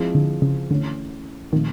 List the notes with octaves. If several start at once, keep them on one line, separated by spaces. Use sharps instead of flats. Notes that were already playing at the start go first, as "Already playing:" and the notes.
Already playing: F3 G#3 C4 E4 G#4
D3
C#3
D3 E3 A3 C#4
A#2 D#3 F3 A3 C4